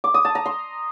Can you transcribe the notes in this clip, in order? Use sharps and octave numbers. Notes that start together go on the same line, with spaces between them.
D6
D#6
A5
A#5
C6